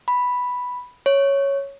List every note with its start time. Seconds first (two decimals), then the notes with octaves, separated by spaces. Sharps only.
0.08 B5
1.06 C#5